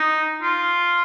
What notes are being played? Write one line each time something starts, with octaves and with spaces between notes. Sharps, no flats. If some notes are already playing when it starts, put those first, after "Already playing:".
Already playing: D#4
F4